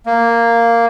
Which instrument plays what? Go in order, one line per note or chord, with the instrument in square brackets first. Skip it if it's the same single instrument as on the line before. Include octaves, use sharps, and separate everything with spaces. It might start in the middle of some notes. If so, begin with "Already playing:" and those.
[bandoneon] A#3